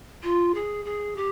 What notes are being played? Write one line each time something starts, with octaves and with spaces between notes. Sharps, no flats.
F4
G#4
G#4
G4